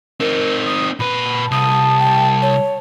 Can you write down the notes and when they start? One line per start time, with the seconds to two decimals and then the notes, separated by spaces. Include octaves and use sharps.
0.20 C4 D#4 A#4
0.66 D#6
1.00 A#2 B4 B5
1.51 C2 A5 D#6
1.99 G5
2.42 C#5